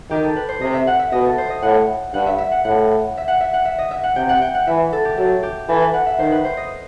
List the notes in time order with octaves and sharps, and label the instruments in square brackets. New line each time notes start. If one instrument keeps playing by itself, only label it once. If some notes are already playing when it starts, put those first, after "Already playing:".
[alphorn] D#3 [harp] G4
[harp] A4
B4
C5
[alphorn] C3 [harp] D#5
[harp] E5
F#5
E5
[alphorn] B2 [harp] D#5
[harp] A4
C5
D#5
[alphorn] A2 [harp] F#5
[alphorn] G2 [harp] F#5
[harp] E5
E5
F#5
[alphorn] A2 [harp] F#5
[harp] E5
F#5
E5
F#5
E5
D#5
E5
F#5
[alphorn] C3 [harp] G5
[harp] F#5
G5
F#5
[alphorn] E3 [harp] E5
[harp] A4
G4
[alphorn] F#3 [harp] A4
[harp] G4
[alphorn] E3 [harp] A4
[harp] B4
F#5
E5
[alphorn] D#3 [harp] C5
[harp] B4
C5
D#5